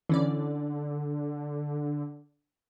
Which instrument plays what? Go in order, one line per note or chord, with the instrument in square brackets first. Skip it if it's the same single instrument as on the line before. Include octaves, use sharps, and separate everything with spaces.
[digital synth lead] D3 [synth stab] E3 C#4 D5